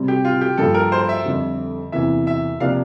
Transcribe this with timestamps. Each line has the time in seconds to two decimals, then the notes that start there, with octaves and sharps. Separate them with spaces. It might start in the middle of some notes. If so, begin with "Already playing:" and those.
Already playing: C3 G3 C4
0.08 G4
0.25 F4
0.41 G4
0.58 G2 F3 A#3 A4
0.74 A#4
0.92 C5
1.09 E5
1.26 F2 D3 G3
1.92 E2 C3 E3 A#3 E5
2.27 E5
2.60 C3 F3 A#3 D4 G4 F5